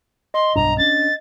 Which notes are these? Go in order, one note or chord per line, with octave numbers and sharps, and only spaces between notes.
D#5 C6
B1 G2 D4 A#5
C#4 D4 A6